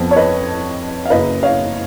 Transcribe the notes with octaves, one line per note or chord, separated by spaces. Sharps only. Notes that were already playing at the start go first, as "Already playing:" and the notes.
Already playing: F2 F3 B3
C#5
B4 D#5
F5
F#1 F#2 C#3 B4 D#5
C#5 F5